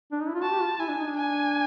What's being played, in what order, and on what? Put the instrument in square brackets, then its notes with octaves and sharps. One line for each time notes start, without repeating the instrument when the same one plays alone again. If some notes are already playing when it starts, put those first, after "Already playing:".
[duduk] D4
D#4
E4
F4
[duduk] F#4 [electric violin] A5
[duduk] G4
F4
[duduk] E4 [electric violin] G#5
[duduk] D4
D#4
D4
[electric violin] G#5